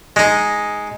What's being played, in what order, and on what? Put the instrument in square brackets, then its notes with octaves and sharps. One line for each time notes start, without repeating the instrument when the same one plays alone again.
[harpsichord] G#3 D#4